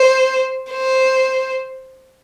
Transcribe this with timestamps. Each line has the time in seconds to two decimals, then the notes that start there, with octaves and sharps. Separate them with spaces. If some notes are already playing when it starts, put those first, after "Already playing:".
Already playing: C5
0.72 C5